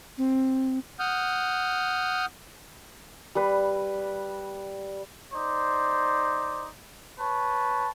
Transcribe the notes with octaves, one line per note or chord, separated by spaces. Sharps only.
C4
F#5 D#6 F6 G6
G3 B4
D#4 C5 D5
B4 C#5 A5